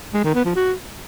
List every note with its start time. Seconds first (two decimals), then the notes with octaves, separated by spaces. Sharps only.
0.14 G#3
0.24 D#3
0.35 B3
0.45 F3
0.56 F#4